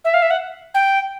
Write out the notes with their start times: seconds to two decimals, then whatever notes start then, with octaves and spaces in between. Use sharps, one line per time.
0.04 E5
0.14 F5
0.22 E5
0.30 F#5
0.74 G5